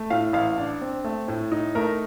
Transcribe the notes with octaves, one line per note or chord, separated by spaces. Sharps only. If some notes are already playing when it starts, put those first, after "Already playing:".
Already playing: A3
A2 F5
A1 F5
D4
C4
A3
A2
D#4
A3 A#4